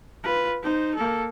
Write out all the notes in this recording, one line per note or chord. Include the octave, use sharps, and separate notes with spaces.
F4 B4
D#4 C5
A#3 A4